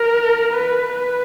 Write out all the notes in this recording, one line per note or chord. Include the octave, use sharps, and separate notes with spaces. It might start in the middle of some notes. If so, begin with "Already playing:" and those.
Already playing: A#4
B4
B4